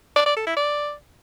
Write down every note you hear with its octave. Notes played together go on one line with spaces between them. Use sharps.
D5
D5
A4
E4
D5